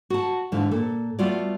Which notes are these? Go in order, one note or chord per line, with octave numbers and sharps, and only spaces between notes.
F#4 A5
G#2 D3 E3 F4 A5
A#2 A4
G3 A3 B3 F4 F#4 D5